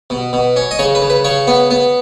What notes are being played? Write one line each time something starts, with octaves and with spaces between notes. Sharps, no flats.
B2
B2
C#4
D#5
C#3 C#5
B4
C#3
B4
C#3 C#5
B3
B3